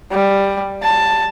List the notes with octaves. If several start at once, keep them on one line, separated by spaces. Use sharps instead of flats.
G3
A5